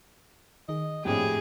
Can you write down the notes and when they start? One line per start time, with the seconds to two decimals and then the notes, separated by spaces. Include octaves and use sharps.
0.69 D#3 G#4 D#5
1.05 F2 A2 A#3 C4 D4 G4 G#4 C#5